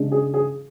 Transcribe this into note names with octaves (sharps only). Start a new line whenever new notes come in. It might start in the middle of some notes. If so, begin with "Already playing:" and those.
Already playing: C#3 G#3 D4
G#4
G#4